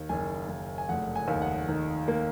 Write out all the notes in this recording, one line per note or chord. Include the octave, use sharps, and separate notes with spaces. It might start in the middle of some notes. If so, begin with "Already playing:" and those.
Already playing: D#2
F#1 G#5
F#1
G#5
F1 F#5
G#5
D#2
F#5
D#3
A#3